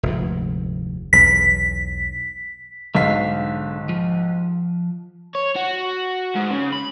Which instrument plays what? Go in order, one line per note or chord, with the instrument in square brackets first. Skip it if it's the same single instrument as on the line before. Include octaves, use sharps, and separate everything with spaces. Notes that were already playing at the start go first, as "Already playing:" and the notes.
[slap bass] F1 D2 G#2
[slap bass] B1 E2 [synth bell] B6
[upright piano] B1 G#2 B6 [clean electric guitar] D3 F5
[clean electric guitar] F3
[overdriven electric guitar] C#5
F#4
G#2
C#3
B5